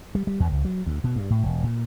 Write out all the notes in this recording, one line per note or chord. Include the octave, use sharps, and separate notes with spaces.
G3
G3
E2
C#2
F#3
D2
B2
G2
A2
E1
A#2